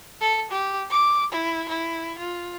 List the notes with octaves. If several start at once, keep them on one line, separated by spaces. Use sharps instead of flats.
A4
G4
D6
E4
E4
F4